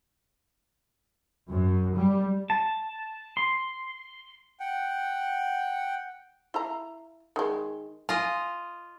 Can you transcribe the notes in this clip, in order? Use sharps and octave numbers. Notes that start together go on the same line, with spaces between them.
F#2
G3
A5
C6
F#5 G5
E4 F5 A#5
D#3 G#3
F4 D#5 G#5